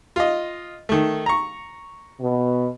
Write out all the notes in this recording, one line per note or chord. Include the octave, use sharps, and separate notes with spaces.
F4 D#5
D#3 A3
A#5 C#6
B2